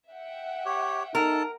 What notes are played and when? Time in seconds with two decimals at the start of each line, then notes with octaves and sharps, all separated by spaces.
0.11 E5 F#5 G5
0.66 G4 C#5
1.15 D#4 A4 A#4 A5